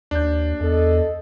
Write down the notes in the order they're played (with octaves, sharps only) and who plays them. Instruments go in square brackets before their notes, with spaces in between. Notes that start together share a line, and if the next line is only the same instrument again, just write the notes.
[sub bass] D#2 [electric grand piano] D4 G6
[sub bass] E2 [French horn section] A4 D#5